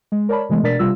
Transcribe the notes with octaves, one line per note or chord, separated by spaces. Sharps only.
G#3
A#4 C#5 D5 A5 B5
C3 E3 G#3 A3 B3
B2 D4 A#4 D5 A6 B6
C3 G3 F4 E6